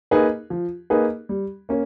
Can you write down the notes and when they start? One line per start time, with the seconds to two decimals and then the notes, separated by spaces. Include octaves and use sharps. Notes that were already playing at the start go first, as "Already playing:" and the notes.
0.11 A#3 D#4 G#4 B4
0.50 F3
0.90 A#3 D#4 G#4 B4
1.29 G3
1.69 A#3 C#4